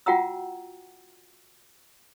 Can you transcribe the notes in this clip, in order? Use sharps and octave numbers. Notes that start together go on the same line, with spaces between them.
F4 F#4 F#5 G5 A#5 E6